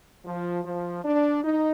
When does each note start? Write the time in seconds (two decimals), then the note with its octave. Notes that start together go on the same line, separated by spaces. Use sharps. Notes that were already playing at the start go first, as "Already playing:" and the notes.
0.25 F3
0.65 F3
1.04 D4
1.43 D#4